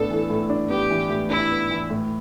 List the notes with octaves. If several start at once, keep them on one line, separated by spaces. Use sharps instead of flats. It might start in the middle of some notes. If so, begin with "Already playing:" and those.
Already playing: A2 B3 D4 A4
E3
A2
D4
B3 G4
E3
A2
D4 E4
B3
E3
A2